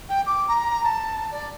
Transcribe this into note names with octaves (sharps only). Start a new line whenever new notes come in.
G5
D6
A#5
A5
D5